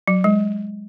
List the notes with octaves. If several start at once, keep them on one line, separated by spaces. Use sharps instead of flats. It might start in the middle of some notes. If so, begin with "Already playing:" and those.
F#3
G#3